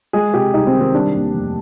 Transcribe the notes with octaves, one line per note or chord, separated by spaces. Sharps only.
G#3 G#4
C3 G4
C2 D#4
C4
D#3
C4
G3 D4
D#2
F1